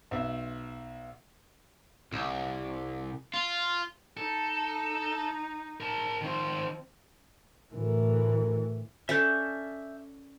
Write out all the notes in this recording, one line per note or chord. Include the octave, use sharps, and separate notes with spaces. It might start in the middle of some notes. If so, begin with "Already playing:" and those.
B1 E5
C2
F4
D#4 A4
A#4 A5
D#3 F3 C4 C5
D2 A2 E3 A#4
C#4 D4 A4 E5 G6